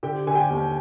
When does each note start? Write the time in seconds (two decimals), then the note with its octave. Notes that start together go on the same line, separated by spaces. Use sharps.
0.03 D3 G4 G5
0.27 D3 G#5
0.35 G4 G5
0.50 D#2